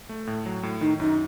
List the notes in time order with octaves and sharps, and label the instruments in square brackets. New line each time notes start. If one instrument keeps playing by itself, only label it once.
[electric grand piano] A3
A2
F#3
A2
[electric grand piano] D#3 [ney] D#4
[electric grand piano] F#2 [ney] D#4